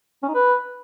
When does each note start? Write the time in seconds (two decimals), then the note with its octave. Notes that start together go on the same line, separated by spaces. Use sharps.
0.23 C#4
0.28 D#4
0.34 B4